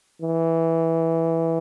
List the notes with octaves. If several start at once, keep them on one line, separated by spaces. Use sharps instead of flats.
E3